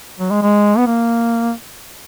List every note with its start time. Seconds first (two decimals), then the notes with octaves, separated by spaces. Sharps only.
0.19 F#3
0.31 G#3
0.42 G#3
0.78 B3
0.87 A#3